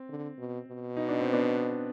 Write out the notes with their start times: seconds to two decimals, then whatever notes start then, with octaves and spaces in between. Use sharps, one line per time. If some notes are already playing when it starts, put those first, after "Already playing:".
Already playing: C4
0.09 D3
0.38 B2
0.68 B2
0.97 D#4
1.08 D4
1.20 C4
1.32 B3 D4